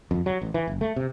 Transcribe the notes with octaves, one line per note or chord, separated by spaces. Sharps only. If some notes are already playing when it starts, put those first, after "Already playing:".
F2
F#3
A1
E3
F#1
A3
C3